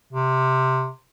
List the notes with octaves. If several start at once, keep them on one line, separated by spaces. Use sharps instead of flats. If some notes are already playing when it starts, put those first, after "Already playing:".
C3